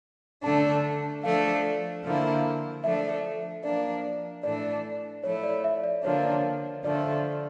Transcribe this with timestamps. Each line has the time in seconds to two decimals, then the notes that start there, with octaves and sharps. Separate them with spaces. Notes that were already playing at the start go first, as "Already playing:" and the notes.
0.44 D3 A3 D4 A5
1.23 F3 A3 D4 F5
2.04 D3 F3 A#3 E4
2.84 F3 A3 D4 E5
3.64 F3 A#3 D4 D5
4.44 A2 E3 A3 D4 D5
5.24 F3 A3 E4 C#5
5.44 D5
5.64 E5
5.84 D5
6.04 D3 F3 A#3 D4 C#5
6.84 D3 F3 A3 D5